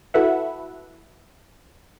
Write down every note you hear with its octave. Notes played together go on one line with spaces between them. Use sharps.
E4 F#4 A4 B4 E5 F#5